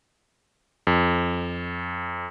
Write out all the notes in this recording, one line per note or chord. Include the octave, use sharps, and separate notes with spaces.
F2